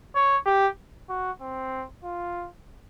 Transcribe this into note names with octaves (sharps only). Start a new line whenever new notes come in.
C#5
G4
F#4
C4
F4